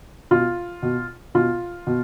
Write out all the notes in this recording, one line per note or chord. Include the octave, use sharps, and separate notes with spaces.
B2 F4
B2
B2 F4
B2